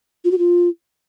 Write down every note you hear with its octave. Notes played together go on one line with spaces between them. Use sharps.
F4
F#4
F4